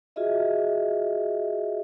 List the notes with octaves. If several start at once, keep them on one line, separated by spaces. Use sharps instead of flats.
F4 F#4 G#4 D#5 E5